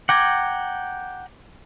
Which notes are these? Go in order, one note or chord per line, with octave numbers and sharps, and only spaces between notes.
F#5 G5 A#5 D6 G#6